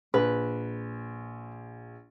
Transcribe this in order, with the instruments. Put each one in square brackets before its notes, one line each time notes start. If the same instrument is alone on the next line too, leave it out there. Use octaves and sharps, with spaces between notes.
[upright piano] A#1 [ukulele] B4